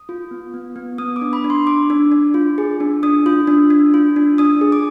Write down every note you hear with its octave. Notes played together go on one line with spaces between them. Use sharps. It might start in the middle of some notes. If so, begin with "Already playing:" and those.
Already playing: D#6
F4
B3
B3
B3
B3 D#6
D6
D4
B5
D4
C6
D4 D6
D4
D4
F4
G#4
D4
D4 D#6
F4
D4
D4
F4
D4
D4 D#6
G#4
D6